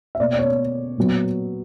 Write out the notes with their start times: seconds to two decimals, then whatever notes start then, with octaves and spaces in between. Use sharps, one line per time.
0.15 E5
0.20 B2 A#3 D5
0.33 D5
0.39 C#5
0.98 A#2 F#3 B3